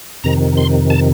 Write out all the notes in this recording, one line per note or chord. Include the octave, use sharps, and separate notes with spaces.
F2 C3 D#3 A#5
C6
A5